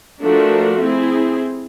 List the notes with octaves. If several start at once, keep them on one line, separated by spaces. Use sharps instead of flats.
F3 A3 D4 F#4 A#4
C4 E4 G#4